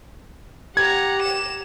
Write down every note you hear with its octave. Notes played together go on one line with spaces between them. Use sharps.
G4 F#5 A#5 G#6
E7